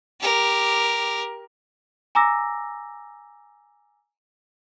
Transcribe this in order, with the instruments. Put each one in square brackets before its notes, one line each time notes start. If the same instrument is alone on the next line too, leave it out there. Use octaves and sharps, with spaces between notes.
[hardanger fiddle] G4 A#4
[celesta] G#5 A#5 D6 E6 A#6